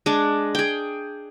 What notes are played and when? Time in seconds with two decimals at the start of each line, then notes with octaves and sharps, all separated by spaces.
0.06 G#3 D4
0.55 G#4 G5